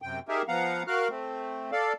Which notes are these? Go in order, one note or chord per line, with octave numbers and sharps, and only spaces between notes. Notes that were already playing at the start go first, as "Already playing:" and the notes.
F#2 C3 G5
D#4 G4 G#4 A#4 E5
F3 B3 F5 F#5 A#5
F#4 A#4 F5 F6 F#6
A3 C4
A4 D5 F5